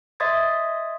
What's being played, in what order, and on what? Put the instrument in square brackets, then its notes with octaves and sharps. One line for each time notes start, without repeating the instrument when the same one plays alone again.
[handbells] D#5 E5 C6 D#6 G#6 A6